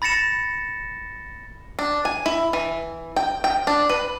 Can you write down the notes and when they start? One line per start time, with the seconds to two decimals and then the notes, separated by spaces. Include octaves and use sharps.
0.02 B5 A6 A#6 C#7 E7
1.79 D4
2.05 G#5
2.26 E4
2.53 E3
3.16 G5
3.44 G5
3.67 D4
3.89 B4